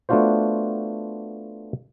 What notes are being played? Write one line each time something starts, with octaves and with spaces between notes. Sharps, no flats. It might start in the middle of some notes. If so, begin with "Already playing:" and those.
A3 B3 D4 F4 F#4 C5